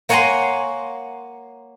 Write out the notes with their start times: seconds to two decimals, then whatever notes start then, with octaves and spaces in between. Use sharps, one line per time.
0.09 A#3 C#5 F#5 G#5 A#5 C6